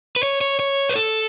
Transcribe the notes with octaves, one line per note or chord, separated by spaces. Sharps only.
B4
C#5
C#5
C#5
B4
A4